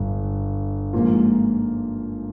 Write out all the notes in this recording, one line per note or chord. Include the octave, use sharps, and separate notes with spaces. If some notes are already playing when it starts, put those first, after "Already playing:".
Already playing: G1 G2
G#2 F3 A#3 F4